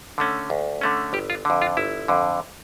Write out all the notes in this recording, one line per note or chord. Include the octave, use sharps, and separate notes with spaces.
D3 A3 C#4
D2
D3 A3 C#4
G1 G4
F4
F2 D3
F4
G1 E4
F2 D3